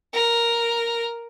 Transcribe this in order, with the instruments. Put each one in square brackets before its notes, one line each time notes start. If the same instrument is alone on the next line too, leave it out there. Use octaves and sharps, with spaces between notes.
[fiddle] A#4